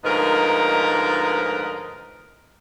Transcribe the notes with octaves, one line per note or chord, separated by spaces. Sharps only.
D2 G#2 F3 A#4 B4 D#5